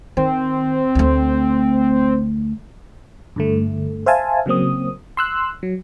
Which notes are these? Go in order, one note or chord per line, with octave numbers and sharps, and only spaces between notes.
D#3 C4
D2 A3
G2 D3 A3
C5 E5 F5 G#5 A5
C#3 F#3 A#3 C4 D#6
C6 E6 F#6
F#3